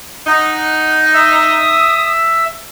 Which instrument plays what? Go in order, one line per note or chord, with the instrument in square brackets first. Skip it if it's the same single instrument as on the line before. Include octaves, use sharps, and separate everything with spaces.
[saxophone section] D#4 [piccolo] F#5
[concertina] E5 E6 [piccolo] D#6